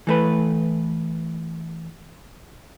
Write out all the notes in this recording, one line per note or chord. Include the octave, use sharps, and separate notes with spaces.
E3 A3 B4